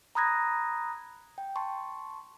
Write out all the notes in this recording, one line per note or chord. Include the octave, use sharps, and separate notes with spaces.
A#5 B5 D#6 F#6 G#6 A#6
G5
A5 C6 C#6